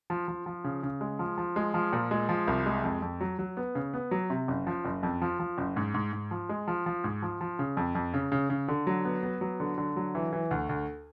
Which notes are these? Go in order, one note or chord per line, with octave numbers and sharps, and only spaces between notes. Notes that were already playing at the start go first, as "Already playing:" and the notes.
F3
F3
F3
C#3
C#3
G#3
F3
F3
G#3
F3
A#2
G#3
F3
C2
G#3
F2
F2
F#3
F#3
B3
C#3
B3
F#3
C3
F#1
F3
F#1
F2
F3
F3
F#1
G#2
G#2
G#2
F3
G#3
F3
F3
G#2
F3
F3
C#3
F2
F2
C#3
C#3
C#3
D3
F#3
B3
B3
F#3
D3
D3
F#3
E3
E3
D2
D2